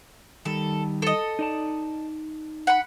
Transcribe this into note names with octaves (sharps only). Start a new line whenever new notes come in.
D#3 G3 A4
A4 D#5
D#4 D5 A5
F#5 B5